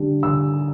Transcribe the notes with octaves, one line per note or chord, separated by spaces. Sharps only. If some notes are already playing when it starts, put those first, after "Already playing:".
Already playing: D3 G3 D4
D3 E6